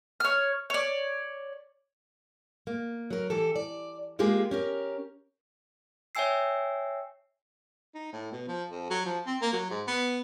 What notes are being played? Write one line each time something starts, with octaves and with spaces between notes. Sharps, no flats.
C#5 F6
C#5 D5
A#3
F#3 A#4
E3 G4 A4
D5
G#3 A#3 F4 G4 G#4
C#4 G4 A#4
C#5 E5 G5 G#5 E6 C7
D#4
A2
B2
F3
F2
F#3
F3
C4
A#3
F#3
G#2
B3